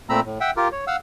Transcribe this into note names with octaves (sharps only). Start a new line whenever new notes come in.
A#2 A3 C4 A#5 B5 E6
A2
E5 F#5 G5
F4 G4 A#4
C#5
F5 F#5 E6